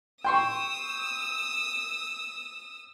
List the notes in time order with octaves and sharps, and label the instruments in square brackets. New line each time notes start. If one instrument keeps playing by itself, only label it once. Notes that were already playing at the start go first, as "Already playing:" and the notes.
[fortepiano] G5 C6 C#6 [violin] D#6 E6